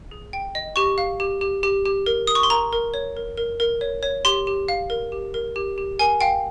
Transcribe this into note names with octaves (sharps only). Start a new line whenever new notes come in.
G#4
G5
D#5
G4 C#6
F5
G4
G4
G4
G4
A#4
A#4 D#6
C#6
C6
A#4 A#5
A#4
C#5
A#4
A#4
A#4
C#5
C#5
G4 C6
G4
F5
A#4
G4
A#4
G4
G4
A#4 G#5
F5 G5